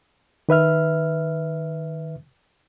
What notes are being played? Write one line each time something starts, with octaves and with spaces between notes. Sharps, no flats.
D#3 B4 E5 F6